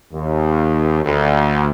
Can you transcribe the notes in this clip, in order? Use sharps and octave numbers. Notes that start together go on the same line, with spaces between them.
D#2
D2